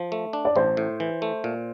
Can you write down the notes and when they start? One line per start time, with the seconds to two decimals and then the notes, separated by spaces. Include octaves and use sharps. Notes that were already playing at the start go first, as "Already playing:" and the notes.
Already playing: F3
0.12 A3
0.33 D4
0.45 D5
0.56 A1 C5
0.77 A2
1.00 E3
1.22 A3
1.44 A#2